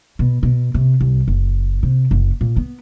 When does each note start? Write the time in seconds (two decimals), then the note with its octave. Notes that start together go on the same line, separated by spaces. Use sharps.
0.19 B2
0.43 B2
0.74 C3
1.01 C2
1.28 F#1
1.83 C3
2.11 F#1
2.41 A#2
2.57 B3